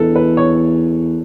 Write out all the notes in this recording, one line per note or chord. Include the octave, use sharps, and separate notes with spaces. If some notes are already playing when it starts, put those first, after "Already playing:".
Already playing: E2 A4 B4
B4
C#5